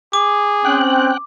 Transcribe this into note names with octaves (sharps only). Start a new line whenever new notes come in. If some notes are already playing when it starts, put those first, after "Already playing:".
G#4 D6
C4 C#4 G5 F#6